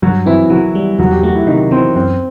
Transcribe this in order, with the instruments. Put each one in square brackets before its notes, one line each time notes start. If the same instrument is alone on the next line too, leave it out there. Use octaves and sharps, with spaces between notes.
[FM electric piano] G2 [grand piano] F#3 F#4
[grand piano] E3 E4 [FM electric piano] C4
[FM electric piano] E3 [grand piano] F#3 F#4
[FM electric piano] G3
[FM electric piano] E2 [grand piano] F#3 F#4
[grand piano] G4
[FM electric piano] A3 [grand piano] F#4
[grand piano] E4
[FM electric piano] C3 [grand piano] D#3 D#4
[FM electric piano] E3 [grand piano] C4
[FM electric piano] F#2 [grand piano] C4